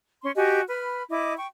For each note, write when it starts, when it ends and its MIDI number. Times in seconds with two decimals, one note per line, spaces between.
0.23 0.31 61
0.23 0.31 84
0.36 0.61 66
0.36 0.61 67
0.36 0.61 75
0.36 0.61 80
0.67 1.02 71
0.67 1.02 83
0.67 1.02 89
1.09 1.34 64
1.09 1.34 75
1.09 1.34 86
1.38 1.47 79
1.38 1.47 85